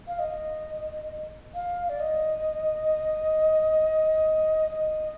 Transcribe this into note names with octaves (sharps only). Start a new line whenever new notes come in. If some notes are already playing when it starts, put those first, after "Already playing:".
F5
D#5
F5
D5
D#5
D#5